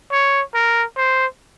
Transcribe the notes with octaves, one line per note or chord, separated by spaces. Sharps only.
C#5
A#4
C5